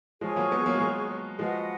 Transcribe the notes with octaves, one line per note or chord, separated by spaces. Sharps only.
F3 G#3 G#4 C#5 G#5 C#6
F#3 A#3
G#3 B3
F#3 A#3
G#3
F#3 A#3
F3 G#3 F#4 B4 D#5 F#5